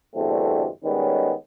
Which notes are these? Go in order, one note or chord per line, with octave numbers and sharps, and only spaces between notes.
E2 G2 B2 D3 A3 C4
D#3 G3 G#3 B3 C#4